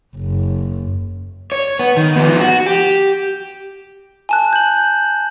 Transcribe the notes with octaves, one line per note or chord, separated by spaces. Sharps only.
F#1
C#5
B3
D#3
F3 B3
F#4
G4
G#5 A5 F#6
G6 F#7